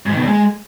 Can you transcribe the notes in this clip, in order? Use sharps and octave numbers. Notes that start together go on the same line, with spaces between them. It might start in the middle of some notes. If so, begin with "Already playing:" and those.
G#2
D#3
B2
E2
G#3